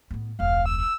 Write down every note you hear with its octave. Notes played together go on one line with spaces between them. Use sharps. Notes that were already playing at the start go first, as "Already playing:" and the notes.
A2 B3
E1 C#2 F5
E6
E6